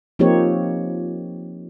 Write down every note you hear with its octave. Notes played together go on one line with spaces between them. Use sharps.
F3 A#3 C4 D#4 G4 C#5